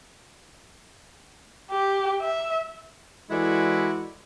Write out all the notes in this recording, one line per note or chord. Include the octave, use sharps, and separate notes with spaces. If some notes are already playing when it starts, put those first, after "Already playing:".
G4
E5
E3 G#3 E4 F#4 A4 D5